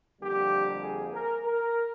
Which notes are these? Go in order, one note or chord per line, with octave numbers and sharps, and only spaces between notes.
F2 D3 G3 A#3 G4
G#4
A#4
A#4